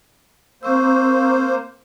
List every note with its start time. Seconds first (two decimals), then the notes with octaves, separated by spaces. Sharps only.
0.63 A#3 C4 C5 C#6 E6